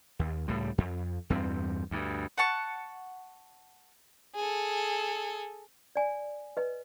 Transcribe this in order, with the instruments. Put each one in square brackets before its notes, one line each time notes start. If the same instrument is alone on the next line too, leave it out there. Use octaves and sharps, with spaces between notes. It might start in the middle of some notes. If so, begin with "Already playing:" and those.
[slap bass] D#2
C#2 A2 G3
F2
E2 G2 C4
D2 G2
[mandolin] F#5 A5 C#6
[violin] G#4 A4
[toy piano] D5 G#5
B4 D#5